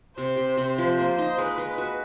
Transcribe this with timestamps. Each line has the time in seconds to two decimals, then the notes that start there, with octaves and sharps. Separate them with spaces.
0.17 C3 C5
0.37 C3
0.57 C3
0.78 F3 C5
0.98 A#3
1.18 D#4
1.38 G#3 B4
1.58 G#3
1.78 F#4